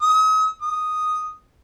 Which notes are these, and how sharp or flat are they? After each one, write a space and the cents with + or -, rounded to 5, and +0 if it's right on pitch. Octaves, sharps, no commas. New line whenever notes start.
D#6 +40
D#6 +0